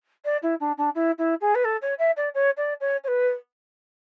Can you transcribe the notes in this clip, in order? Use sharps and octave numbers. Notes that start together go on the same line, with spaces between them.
D5
E4
D4
D4
E4
E4
G#4
B4
A4
C#5
E5
D5
C#5
D5
C#5
C#5
B4